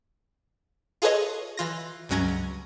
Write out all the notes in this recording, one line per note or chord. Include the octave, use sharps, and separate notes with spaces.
F4 G#4 A4 B4 C#5 D#5
E3 F4 A#6
C#2 G2 F#3 C#4 A#5 G#6